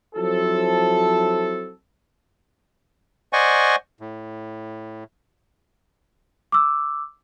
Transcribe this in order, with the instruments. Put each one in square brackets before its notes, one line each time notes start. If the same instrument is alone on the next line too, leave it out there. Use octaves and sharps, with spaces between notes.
[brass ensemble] F3 F#3 C4 E4 A4
[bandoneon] C5 D5 D#5 F#5 G#5 C#6
A2
[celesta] D6 E6